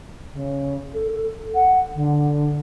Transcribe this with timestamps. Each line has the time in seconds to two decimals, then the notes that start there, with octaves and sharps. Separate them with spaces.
0.33 C#3
0.94 A4
1.11 A4
1.54 F#5
1.94 D3